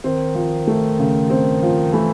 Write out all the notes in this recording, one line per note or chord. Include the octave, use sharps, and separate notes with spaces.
D#3 C4
F3
A3
C#3
C4
F3
E3 A3